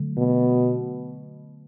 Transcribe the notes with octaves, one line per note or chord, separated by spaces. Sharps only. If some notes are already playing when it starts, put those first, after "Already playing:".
Already playing: D3 F#3 A3
B2